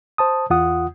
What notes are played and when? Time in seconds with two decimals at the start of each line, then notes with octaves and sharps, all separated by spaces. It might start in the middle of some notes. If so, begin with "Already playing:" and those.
0.18 C5 A5 D#6
0.50 E2 F4 F#5 D#6